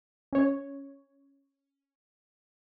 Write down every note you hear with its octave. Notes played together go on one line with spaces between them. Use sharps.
C#4 C#5